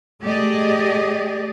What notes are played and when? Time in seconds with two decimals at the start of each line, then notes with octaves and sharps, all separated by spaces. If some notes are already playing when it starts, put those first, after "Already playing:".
0.22 A3 G4 G#4 D5 D#5